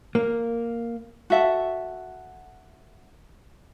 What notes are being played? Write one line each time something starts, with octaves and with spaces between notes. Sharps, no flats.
A#3
F#4 A4 E5 F#5